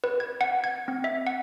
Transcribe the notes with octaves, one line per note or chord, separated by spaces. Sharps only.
B4
G#6
F#5
G#6
C4
E5
F#5